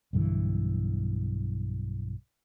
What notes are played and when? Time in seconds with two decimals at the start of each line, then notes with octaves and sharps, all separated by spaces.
0.13 B1 G2 D3 E3